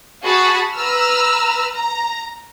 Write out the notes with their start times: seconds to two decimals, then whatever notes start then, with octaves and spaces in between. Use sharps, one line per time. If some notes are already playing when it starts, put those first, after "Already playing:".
0.24 F#4 G#4 A5 B5
0.75 B4 A#5 E6 F6
1.75 A#5